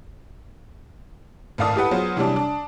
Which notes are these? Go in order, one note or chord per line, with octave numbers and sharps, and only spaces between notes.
G#1 A2 D5 F5 A5 D#6
E4 G4 A4 B4 F#5
F#3 B3 F4 G#4 C5
C3 E3 F#3 G3 C#4 D4
D4